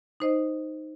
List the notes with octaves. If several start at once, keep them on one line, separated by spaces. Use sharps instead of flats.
D#4 C5 D#5